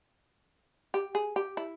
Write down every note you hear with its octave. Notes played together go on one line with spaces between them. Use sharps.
G4
G#4
G4
E4